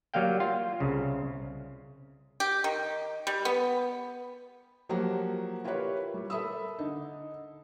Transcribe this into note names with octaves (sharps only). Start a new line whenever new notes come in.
F#3 G3 A#3 F5 G5
F4
C2 C#3
G4
D#3
G3
B3
F3 F#3 A#3 G4 F#5 A#5
E4 F4 G4 A#4 B4 C#5
G3
A4 A#4 E5 B5 D#6 E6
D3 D#4